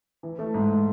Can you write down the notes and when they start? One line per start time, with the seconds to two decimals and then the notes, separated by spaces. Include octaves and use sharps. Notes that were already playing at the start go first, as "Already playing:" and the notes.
0.23 E3
0.39 A3
0.54 G#2